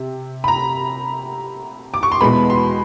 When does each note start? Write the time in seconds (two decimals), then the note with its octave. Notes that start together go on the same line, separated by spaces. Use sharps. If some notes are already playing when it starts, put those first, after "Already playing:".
Already playing: C3
0.44 B5
0.48 A#5
1.94 D6
2.03 C#6
2.12 C6
2.21 E2 B2 G#3 B3 B5
2.50 C6